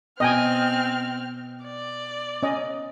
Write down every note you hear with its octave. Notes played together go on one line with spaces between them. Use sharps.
B2 C4 D#5 G5 G#5 F6
D5
C#4 D#5